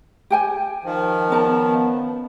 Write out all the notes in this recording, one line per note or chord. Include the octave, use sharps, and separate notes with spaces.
G4 G5 G#5
D#3 F3
B3 C#4 A#4 A5